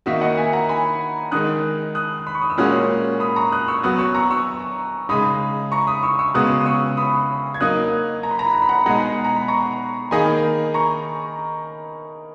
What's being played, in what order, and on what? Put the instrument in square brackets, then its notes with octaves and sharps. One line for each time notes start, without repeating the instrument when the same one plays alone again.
[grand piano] D#3 A#3 D#4 F#4 [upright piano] E5
[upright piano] D#5 F#5
E5 G#5
F#5 A#5
G#5 B5
[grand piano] D#3 G#3 D#4 [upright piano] D#6 F#6
[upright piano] D#6 F#6
B5
C#6
D#6
E6
[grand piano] A#2 G#3 C#4 F#4 [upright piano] D#6 F#6
[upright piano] B5 D#6
A#5 C#6
D#6 F#6
C#6 E6
[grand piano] F#3 B3 F#4 [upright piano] D#6 F#6
[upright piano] C#6 E6
A#5 C#6
C#6 E6
[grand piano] C#3 G#3 D#4 [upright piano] B5 D#6
[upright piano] A#5 C#6
B5 D#6
C#6 E6
C#6 E6
[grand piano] C#3 G#3 B3 F#4 [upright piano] D#6 F#6
[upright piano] D#6
C#6 E6
B5 D#6
G#6
[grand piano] F#3 A#3 D#4 [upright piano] D#6 F#6
[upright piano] A#5
B5
A#5
B5
A#5
B5
F#5 A#5
[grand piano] B2 G#3 D#4 G#4 [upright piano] F#5 A#5
[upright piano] A#5
B5
A#5 C#6
[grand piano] D#3 A#3 D#4 G#4 [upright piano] G#5 B5
[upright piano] A#5 C#6